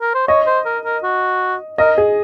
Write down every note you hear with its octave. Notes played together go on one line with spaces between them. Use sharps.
A#4
C5
C#5 D#5
C5
A#4
A#4
F#4
A#4 D#5
G#4